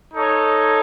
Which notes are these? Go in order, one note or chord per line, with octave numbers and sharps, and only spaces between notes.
D#4 A4 C#5